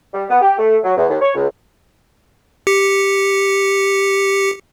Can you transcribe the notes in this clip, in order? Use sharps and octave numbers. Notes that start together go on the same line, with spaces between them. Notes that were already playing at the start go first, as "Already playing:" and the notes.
G3
B3
G4
A3
F#3
E2
D#2
C#5
C#2
G4 C#7